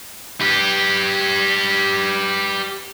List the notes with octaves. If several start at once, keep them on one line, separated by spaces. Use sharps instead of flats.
G4 B4